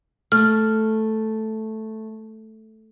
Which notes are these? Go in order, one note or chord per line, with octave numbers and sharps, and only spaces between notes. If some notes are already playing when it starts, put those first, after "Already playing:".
A3 F6